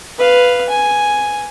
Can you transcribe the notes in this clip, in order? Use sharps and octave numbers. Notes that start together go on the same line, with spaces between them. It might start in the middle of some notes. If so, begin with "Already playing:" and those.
B4 F5
G#5